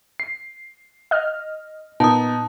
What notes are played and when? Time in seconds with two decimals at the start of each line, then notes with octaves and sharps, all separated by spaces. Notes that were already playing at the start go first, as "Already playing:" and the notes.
0.20 C7
1.11 D#5 F6
2.00 A#2 B3 D#4 A5 D#6